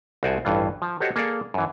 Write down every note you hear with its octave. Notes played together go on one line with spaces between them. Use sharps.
C2 F#4 C5 D5 G#5 A5
A1 G2 E3 F4
F3
F#4 G4 A4 C5 C#5 D#5
A#3 G#4 A4 D5 F5
F#2 E3